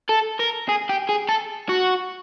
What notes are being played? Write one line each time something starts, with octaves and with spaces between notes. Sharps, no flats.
A4
A#4
G#4
G4
G#4
A4
F#4